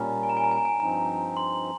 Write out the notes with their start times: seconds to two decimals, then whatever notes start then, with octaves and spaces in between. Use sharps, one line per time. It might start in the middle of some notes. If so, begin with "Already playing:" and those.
Already playing: A#2 G3 C#4 A#5
0.23 G#5
0.29 A#5
0.37 G#5
0.44 A#5
0.51 G#5
0.58 A#5
0.65 G#5
0.80 G2 F3 C4 D#4 A#5
1.37 C6